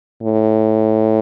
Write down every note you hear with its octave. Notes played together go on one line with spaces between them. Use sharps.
A2